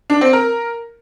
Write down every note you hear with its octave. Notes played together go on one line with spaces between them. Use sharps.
D4
C4
A#4